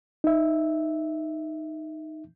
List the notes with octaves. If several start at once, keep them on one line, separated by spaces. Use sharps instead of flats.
D#4 E5